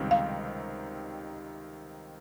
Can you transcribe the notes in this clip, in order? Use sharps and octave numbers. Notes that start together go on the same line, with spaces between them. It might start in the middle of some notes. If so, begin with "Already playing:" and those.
Already playing: C#2 C3 D#3 G3 C4
F5